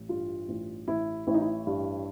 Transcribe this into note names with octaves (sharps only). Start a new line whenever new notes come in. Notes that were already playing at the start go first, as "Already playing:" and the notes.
Already playing: A1
G2 F4
A1
A1 E4
A1 E4
D#4
E4
G2